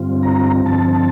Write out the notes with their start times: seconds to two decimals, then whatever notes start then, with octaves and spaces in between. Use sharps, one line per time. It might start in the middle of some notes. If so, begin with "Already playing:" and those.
Already playing: G2 D3 G3 C4 F4
0.23 A#5
0.66 G2 D3 F3 C4 A5
0.95 A5